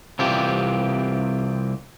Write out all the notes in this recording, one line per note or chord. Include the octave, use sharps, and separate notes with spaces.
C2 E3 C4 F4 G4